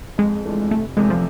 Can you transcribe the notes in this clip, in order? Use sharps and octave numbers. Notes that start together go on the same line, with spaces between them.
F2 G#3
E3 A3 D4 F4
F1 A3
E2 C3 F3 G#3 A3
F3